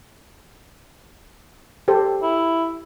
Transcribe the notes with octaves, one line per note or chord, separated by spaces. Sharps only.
G4 A4 C5
E4